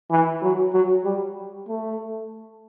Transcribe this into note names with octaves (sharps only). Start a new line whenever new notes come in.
E3
F#3
F#3
G3
A3